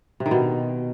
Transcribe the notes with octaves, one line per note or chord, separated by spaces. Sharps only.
C3
D#3
B2